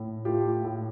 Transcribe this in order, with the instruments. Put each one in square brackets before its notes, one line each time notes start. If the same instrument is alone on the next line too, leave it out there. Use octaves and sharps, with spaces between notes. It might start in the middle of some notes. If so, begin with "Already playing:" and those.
Already playing: [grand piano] A2
A3 F4 G4
A2